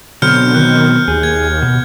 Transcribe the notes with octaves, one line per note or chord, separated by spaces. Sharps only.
B2 D3 F#3 C4 F6 G6 C#7
D#3 F#6
D#2 G#4
G#6
B2